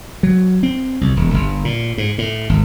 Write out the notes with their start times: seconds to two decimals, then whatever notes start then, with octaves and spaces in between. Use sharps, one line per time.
0.23 F#3
0.63 C4
1.01 C2
1.17 E1
1.34 G1
1.65 A#2
1.98 G#2
2.18 A2
2.49 G#1